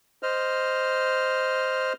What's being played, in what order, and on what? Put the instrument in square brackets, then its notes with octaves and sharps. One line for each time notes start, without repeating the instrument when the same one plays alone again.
[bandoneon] C5 D#5 F6